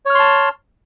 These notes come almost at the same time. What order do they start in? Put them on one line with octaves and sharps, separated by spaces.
C#5 F6 C6 A5